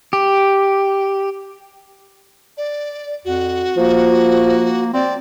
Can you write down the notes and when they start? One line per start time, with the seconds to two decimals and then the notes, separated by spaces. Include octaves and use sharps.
0.13 G4
2.58 D5
3.25 F2 F#4
3.77 F3 A#3
4.94 C4 D5